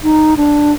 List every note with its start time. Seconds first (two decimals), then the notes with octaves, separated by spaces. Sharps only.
0.03 D#4
0.37 D4